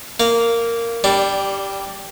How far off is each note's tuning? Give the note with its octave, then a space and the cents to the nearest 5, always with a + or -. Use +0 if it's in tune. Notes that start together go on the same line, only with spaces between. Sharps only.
A#3 -10 F5 +0
G3 +0 D4 -15